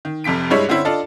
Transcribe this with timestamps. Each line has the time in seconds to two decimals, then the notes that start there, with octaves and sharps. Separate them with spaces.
0.05 D#3
0.24 F1 F2 C3 B6 D7
0.50 G2 G3 G#3 E4 C#5
0.69 D3 C4 C#4 E4
0.85 D4 F4 A4 D#5